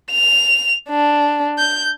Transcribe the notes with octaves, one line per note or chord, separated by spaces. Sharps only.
F7
D4
G6